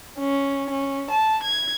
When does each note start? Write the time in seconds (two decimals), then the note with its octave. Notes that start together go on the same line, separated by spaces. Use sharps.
0.19 C#4
0.70 C#4
1.11 A5
1.43 G#6